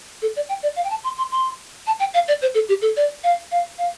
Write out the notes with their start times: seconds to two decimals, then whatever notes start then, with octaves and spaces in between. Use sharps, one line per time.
0.22 A4
0.36 D5
0.49 G5
0.63 D5
0.76 F5
0.84 G5
0.90 A5
1.04 C6
1.18 C6
1.32 C6
1.87 A5
2.00 G5
2.14 F5
2.28 D5
2.42 C5
2.54 A4
2.69 G4
2.82 A4
2.97 D5
3.24 F5
3.51 F5
3.78 F5